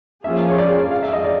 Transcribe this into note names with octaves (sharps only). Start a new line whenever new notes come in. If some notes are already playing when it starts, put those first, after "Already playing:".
F3 A#3 C#4 F4 G#4 E5
C#5
D5
F5
E5
D#5
D5